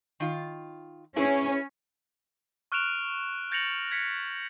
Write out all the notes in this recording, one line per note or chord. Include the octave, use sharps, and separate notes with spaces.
D#3 F4
C#4 E4 G#4 B4
C#6 F6 F#6 D7 E7 F7
G6 A6 A#6 C#7 F7 F#7
G#6 B6 C#7